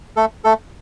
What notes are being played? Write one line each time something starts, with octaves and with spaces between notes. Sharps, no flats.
A3 A4
A3 A4